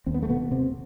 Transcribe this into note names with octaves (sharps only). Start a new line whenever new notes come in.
D#2 C4
B3
A3
B2 B3
C3 C4